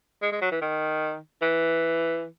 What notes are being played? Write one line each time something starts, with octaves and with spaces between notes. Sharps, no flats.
G#3
G#3
F#3
E3
D#3
E3